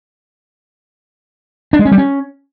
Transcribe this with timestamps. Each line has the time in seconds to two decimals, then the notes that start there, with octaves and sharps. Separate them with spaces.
1.73 D4
1.79 G#3
1.85 C#4
1.91 G3
1.98 C#4